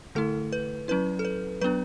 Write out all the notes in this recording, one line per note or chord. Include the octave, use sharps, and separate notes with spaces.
D3 A3 E4 A4
B4
F#3 C#4 E4 B4
A4
B4
F#3 B3 D4 B4